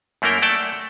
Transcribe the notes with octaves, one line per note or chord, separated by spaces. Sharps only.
F#2 A3 A#3 E4 A#4 G5
A3 D5 F#5 G5 A5